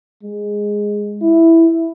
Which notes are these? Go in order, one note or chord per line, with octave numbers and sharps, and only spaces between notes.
G#3
E4